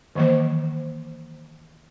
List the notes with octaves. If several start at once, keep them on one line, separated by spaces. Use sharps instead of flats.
D#3 E3 F#3 A#3 C5